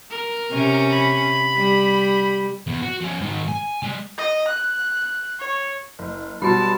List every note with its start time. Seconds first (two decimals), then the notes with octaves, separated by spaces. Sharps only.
0.11 A#4
0.51 C3 C#4
0.91 B5
1.58 G3
2.67 E2
2.82 F#4
3.01 F3 C#4
3.21 G#2 D#3
3.48 G#5
3.83 G3 G#3
4.18 D#5
4.48 F#6
5.40 C#5
5.99 F#1
6.42 B2 F#3 G3 A5 B5 C6